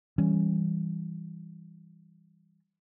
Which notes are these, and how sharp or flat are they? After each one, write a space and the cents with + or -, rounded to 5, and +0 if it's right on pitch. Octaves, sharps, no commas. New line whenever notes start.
E3 +0 G3 +5 C#4 +0